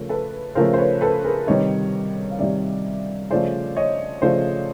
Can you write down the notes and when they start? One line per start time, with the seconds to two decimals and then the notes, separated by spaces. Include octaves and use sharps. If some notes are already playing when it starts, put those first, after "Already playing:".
Already playing: C#3 F3 A3 A#4
0.09 A4 B4
0.55 C#3 F3 A3 A#4 C5
0.73 C5
0.78 B4 C#5
1.01 A4 B4
1.24 G#4 A#4
1.47 C3 D#3 G3 C#5 D#5
2.31 F5
2.39 C3 D#3 G3 D5 E5
3.30 C#3 F3 A3 C5 D5
3.76 C#5 D#5
4.21 C#3 F3 A3 C5 D5